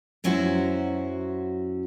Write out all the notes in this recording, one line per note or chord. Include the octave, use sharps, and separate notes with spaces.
F#2 F#3 C#4 E4 F#4 C5